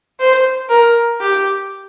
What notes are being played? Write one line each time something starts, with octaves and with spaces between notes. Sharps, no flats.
C5
A#4
G4